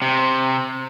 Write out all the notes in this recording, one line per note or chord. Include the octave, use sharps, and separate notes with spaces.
C3